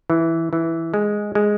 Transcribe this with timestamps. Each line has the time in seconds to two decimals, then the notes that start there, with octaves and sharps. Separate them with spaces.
0.10 E3
0.53 E3
0.94 G#3
1.35 G#3